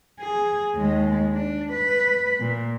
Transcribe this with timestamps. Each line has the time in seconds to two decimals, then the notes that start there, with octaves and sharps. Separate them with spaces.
0.20 G#4
0.75 D#2 G#3
1.33 D4
1.72 B4
2.40 A#2